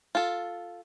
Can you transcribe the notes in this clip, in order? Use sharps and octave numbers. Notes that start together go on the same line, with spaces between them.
F4 A4